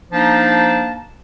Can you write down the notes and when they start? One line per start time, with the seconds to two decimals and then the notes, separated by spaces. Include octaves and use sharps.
0.12 F3 A#3 D4 D#4 A5